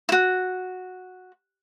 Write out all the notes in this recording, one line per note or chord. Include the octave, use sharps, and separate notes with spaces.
E4 F#4